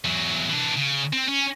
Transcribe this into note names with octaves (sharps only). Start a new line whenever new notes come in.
E2 F#3
E3 D4
C#3
C4
C#4